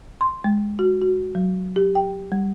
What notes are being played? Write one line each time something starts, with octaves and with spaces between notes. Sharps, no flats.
C6
G#3
F#4
F#4
F#3
G4
G5
G3